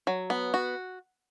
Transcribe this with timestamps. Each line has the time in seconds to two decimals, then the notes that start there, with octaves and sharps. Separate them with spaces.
0.07 F#3
0.30 B3
0.54 F#4